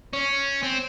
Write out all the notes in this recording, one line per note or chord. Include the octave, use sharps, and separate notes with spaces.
C#4
C4